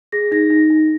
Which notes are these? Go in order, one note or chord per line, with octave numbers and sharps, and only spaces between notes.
G#4 A#6
D#4 A#6
D#4
D#4